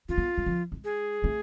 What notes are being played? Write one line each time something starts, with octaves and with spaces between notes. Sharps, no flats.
D4 F4
B3
G#3
F3
G#3
G#4
A3